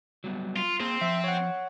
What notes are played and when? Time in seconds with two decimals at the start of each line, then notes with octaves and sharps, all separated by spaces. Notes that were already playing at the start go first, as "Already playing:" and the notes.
0.24 F#3 G3 B3
0.56 F4
0.80 A#3 C4 G#4
1.01 F3 E5
1.24 C#5 F#5